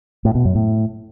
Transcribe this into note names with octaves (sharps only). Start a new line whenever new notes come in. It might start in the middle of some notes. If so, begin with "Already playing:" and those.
A2
B2
F#2
A2